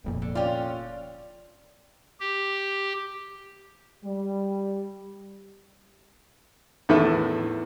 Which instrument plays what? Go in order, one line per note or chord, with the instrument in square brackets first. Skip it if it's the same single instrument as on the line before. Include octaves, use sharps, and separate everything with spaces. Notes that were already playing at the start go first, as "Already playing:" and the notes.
[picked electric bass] F1 F2 A#2
[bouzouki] D3
[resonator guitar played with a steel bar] C#4 F4 [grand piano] D5 F5 G5
[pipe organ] G4
[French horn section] G3
[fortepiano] E2 A2 D#3 E4 A4 B4